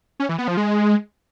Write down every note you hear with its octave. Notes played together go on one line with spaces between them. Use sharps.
C#4
E3
B3
F3
G#3